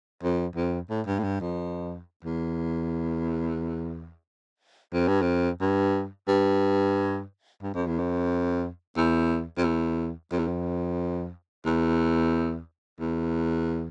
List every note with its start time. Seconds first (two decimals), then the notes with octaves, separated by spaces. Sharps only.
0.23 F2
0.56 F2
0.90 A2
1.06 G2
1.19 A2
1.23 G2
1.40 F2
2.25 E2
4.93 F2
5.08 G2
5.21 F2
5.61 G2
6.28 G2
7.62 G2
7.75 F2
7.87 E2
7.99 F2
8.97 E2
9.57 F2
9.64 E2
10.31 F2
10.39 E2
10.48 F2
11.66 E2
13.00 E2